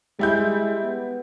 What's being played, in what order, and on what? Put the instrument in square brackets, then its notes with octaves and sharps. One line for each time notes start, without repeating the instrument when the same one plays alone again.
[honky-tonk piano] G3 E4 G6 [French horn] G#3
[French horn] B3